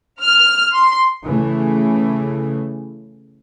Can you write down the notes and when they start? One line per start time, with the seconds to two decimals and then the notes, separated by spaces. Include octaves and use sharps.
0.23 F6
0.74 C6
1.24 C#3 E3 A3